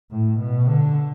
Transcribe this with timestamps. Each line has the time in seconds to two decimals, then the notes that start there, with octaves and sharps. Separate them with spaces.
0.11 A2
0.39 B2
0.68 D3